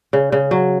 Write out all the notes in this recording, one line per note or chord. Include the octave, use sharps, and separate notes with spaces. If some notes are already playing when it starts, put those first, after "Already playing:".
C#3
C#3
F#3